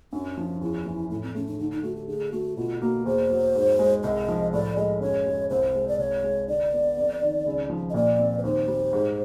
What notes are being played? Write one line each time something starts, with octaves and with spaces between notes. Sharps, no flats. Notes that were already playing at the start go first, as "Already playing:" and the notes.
F#2 D4
F3
E2 E4
E3
A2 E4
C4
A3 C#4
D4
D3 D#4
D#4
A3 F#4
G4
D3 G#4
A3 F#4
B2 F4
A#3 F#4
E2 C5
F#3
G#2
G#3
C2 D#5
F3
A2 D5
G#3 D#5
F#2 C#5
G#3
C2 C5
G#3
D5
C2 C#5
G#3
D3 D5
B3
F2
D#3
C#2
F3
D#5
A#2 D5
C4
B4
D#2 C5
G3
G#2